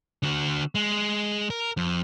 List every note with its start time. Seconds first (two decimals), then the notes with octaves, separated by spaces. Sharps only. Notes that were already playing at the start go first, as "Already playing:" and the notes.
0.23 D3 F#4
0.75 G#3
1.50 A#4
1.77 F2